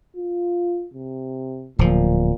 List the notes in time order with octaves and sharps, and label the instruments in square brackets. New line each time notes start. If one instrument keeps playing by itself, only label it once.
[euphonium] F4
C3
[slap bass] D1 F3 [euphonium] A#2